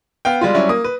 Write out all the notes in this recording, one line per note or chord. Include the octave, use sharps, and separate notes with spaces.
B3 F5 G5
G3 G#3 F4
F#3 G3 C#4 E4
A#3 D#6
B4